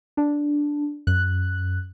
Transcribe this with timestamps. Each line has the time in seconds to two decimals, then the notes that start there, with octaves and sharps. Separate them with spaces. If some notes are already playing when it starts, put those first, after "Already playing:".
0.17 D4
1.07 F#2 F#6